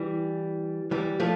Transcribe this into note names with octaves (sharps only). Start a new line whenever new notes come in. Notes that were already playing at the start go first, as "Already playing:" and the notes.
Already playing: E3 G3
E3 G3
F3 A3